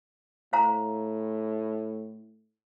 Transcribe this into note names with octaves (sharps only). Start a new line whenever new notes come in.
A2 C5 F5 A#5